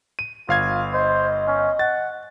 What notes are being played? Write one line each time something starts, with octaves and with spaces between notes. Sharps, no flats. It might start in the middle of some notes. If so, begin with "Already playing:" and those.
D#7
G1 F4 F5 G#6
C5 D#5
C#4
F#5 A6